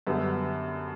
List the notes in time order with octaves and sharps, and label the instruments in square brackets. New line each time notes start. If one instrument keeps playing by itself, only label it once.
[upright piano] F#2 D3 G3 B3